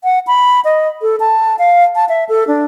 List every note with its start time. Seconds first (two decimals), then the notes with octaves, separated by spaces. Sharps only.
0.04 F#5
0.27 B5
0.65 D#5
1.02 A4
1.20 A5
1.59 F5
1.95 A5
2.09 E5
2.29 A4
2.48 D4